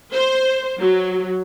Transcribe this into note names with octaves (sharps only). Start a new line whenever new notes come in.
C5
F#3